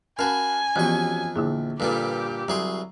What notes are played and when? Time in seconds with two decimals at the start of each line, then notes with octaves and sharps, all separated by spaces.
0.19 C#4 F#4 A#4 F5 G#5 A5 B5
0.76 F2 E3 F3 B3 C#4 F#4 G4 C#6
1.36 A#1 D3 E4 G#4
1.80 G2 A#2 G3 G4 A4 B4
2.48 C2 F#3 G#4 C6